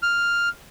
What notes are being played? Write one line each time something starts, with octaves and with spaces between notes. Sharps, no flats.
F6